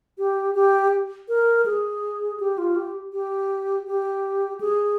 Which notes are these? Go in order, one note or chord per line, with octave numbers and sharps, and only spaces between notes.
G4
G4
A#4
G#4
G4
F4
G4
G4
G4
G#4